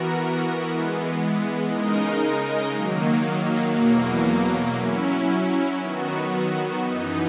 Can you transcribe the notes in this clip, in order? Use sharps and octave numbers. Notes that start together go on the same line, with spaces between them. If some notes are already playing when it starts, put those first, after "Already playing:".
Already playing: E3 B3 F#4 A#4
E3 G#3 B3
C#3 G#3 D#4 A#4 D#5
D#3 F#3 A#3
E2 B2 F#3 A#3
F#3 C#4 E4
D#3 F#3 B3 F#4
F#2 E3 B3 D#4